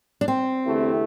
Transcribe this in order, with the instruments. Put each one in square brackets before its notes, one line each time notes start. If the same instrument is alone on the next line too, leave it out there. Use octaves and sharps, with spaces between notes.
[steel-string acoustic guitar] D4
C4
[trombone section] E2 D3 A3 E4 G4